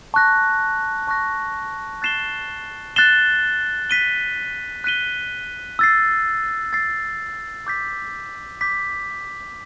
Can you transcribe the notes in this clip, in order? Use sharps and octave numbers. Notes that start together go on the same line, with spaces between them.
A5 C#6 F#6 A#6
A5 C#6 F#6 A#6
F#6 A6 C7 E7 G7
F#6 A6 C7 E7 G7
F#6 B6 D#7 G7
F#6 B6 D#7 G7
E6 A6 C7
E6 A6 C7
D6 G6 B6
D6 G6 B6